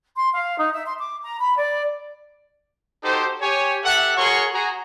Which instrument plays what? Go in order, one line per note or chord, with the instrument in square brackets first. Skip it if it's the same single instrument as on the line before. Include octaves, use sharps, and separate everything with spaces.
[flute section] C6
F5
D#4
E5
C6
D6
A#5
B5
D5
[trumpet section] D#4 F#4 G4 A4 C5
G4 C#5 G#5
G4 A4 E5 F#5
F#4 G#4 A#4 C#5 C6 C#6
F#4 G#4 A#5